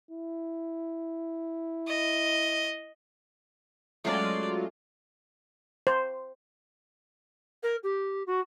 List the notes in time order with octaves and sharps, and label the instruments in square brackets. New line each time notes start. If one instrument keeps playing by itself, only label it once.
[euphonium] E4
[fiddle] D#5
[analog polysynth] F#3 G#3 F4 [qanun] A3 C#4 [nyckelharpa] D5
[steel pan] C5
[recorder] A#4
G4
F#4